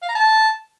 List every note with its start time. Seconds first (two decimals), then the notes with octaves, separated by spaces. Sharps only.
0.02 F5
0.08 A#5
0.15 A5